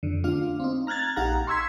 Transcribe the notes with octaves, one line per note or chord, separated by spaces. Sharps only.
F2 D3
A3 D4 F4 F5
C4 D#4
A#5 F6 F#6 G#6 A6
A#1 D#4 G4 F5 F#5 A#5
C6 C#6 E6 G#6 B6